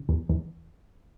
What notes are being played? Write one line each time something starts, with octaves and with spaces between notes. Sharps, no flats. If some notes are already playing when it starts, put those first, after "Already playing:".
Already playing: C#3
E2
E2